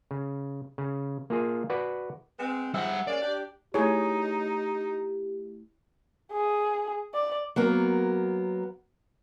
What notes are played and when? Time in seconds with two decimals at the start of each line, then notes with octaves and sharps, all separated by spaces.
0.11 C#3
0.78 C#3
1.30 A#3 F4 G#4
1.70 F#4 B4 D5
2.39 G#3 B3 C4
2.74 G#2 F3 G3 E5 F#5
3.07 G#3 A#3 C#4 D5
3.22 D4 G4
3.74 A3 D#4 E4 G4 G#4 C#5
6.32 G#4
7.14 D5
7.56 F#3 A#3 B3 A#4